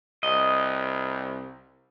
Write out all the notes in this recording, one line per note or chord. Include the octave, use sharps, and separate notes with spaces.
C2 D#5